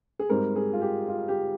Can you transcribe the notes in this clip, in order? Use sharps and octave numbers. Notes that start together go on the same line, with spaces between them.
G#4
G#2 G3 C4 A#4
G#4
F4
G4
F4
G4